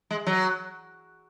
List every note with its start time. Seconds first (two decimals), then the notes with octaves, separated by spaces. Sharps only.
0.11 G#3
0.27 F#3